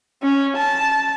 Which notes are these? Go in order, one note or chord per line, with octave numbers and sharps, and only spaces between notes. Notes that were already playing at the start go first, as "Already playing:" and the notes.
C#4
A5